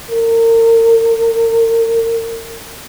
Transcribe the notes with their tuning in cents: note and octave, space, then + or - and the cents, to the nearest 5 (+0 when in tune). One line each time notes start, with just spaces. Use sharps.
A#4 -35